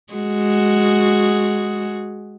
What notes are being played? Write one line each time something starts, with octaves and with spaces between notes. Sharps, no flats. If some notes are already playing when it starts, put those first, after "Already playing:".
G#3 F#4 G#4